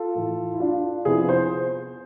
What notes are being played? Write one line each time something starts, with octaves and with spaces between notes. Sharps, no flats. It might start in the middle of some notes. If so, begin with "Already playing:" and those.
Already playing: F4 A4
A2 E3 A3
E4
D4 F4
C3 F3 B3 E4 G#4
C5